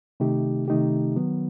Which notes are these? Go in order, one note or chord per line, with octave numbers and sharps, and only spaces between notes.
C3 D#3 A3 D#4 G4
C3 D#3 A3 D#4 G4
D#3 F#3 B3